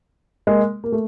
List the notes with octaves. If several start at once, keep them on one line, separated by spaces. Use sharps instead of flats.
G#3 A#3
A#3
A3